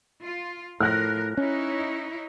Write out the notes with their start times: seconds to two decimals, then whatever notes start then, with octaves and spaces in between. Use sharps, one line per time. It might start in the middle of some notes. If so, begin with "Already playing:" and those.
0.22 F4
0.80 A2 F3 A#4 F6 F#6 A#6
1.37 C#4 D#4 E4 C#5